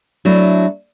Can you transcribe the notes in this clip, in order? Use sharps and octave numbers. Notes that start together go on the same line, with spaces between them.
F#3 A3 D4 E4